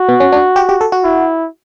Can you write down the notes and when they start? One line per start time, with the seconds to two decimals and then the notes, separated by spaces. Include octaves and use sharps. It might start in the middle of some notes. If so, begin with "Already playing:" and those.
Already playing: F#4
0.09 B3
0.20 C#4
0.32 D4
0.56 G4
0.69 G4
0.81 A4
0.92 F#4
1.04 E4